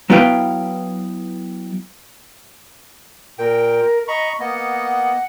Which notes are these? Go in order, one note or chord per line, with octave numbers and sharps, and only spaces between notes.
F#3 B3 E4 B4 F5 G5
A#2 A#4 G5
D#5 A#5 B5 C#6
A#3 B3 D#5 F#5